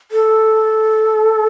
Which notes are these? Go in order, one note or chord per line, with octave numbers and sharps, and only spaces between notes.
A4